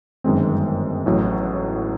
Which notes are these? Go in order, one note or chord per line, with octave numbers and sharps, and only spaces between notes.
G1 F#2 D#3 G#3 C4
A1 A2 F#3